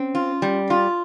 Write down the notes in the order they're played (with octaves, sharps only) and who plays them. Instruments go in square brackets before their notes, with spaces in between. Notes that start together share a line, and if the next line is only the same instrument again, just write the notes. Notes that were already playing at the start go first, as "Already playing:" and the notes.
Already playing: [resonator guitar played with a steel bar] C4 [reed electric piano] C#4
[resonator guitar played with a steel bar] F4
G3
F4